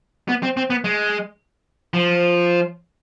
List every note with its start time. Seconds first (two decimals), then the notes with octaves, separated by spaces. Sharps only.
0.29 B3
0.43 C4
0.57 C4
0.70 B3
0.84 G#3
1.94 F3